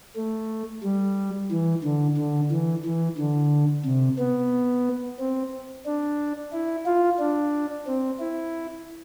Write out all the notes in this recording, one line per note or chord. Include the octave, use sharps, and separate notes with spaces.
A3
G3
E3
D3
D3
E3
E3
D3
C3
B3
C4
D4
E4
F4
D4
C4
E4